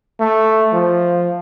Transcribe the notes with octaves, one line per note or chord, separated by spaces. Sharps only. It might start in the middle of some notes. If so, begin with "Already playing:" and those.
A3
F3